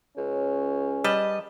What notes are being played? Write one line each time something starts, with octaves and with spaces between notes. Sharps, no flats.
C#2 C#4
G3 B4 D#5 A5